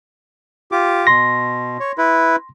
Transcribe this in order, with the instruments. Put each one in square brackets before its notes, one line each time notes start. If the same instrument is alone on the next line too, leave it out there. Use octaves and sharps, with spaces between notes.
[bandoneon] F4 G4 D6
[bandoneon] B2 [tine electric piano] C6 A#6
[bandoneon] C#5
E4 B4